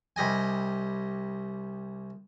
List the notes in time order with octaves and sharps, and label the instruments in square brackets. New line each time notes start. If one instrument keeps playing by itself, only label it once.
[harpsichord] C2 G3 D#5 G#5